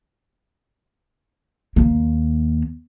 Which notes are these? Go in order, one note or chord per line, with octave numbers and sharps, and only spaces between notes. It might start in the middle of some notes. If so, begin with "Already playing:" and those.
D#2 A#3